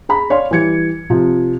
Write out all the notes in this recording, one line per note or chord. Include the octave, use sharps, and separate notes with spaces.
G#4 A#5 B5
C#5 D5 F5 C6
E3 G3 G#6 C#7
C3 F3